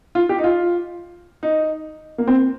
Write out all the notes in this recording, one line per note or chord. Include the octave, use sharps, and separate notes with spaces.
F4
G4
D#4
F4
D#4
A#3
C4